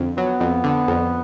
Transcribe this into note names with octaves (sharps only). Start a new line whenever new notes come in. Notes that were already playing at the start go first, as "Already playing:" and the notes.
Already playing: F2 D3
F#3 B3
F2
D3
F2